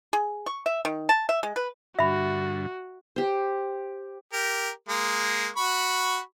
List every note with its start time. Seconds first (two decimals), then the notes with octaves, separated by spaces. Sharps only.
0.13 G#4
0.46 C#6
0.66 E5
0.85 D#3
1.09 A5
1.29 E5
1.43 G#3
1.56 B4
1.99 G2 D3 F#4 E5 B5
3.16 G4 C5
4.33 G4 A#4
4.88 G#3 A#3
5.56 F#4 B5 C#6